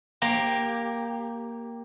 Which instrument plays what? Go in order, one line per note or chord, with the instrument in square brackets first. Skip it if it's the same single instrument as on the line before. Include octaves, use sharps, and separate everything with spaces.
[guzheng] A#3 G4